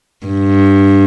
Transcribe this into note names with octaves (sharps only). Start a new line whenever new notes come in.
G2